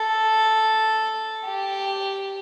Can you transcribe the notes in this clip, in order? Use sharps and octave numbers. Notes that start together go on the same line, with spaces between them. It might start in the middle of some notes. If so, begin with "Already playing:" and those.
Already playing: A4
G4